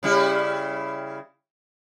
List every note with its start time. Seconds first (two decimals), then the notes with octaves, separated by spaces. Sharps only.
0.03 C#3 G3 E4